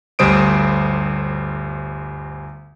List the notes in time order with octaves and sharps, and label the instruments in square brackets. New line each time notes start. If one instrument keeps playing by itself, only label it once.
[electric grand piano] G1 D2 G3 C5 D#6 D7